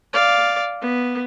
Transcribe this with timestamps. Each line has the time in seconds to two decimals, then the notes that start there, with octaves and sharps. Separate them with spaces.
0.13 D5 F5
0.82 B3